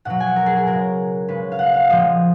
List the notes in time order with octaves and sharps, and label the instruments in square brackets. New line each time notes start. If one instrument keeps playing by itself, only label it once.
[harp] B2 F#3 F#5
G#5
A#4
G#4
G#4
C#3 G#3 A#4
C#3 G#3 B4
F5
F#5
F5
A#2 F3 G#3 D#5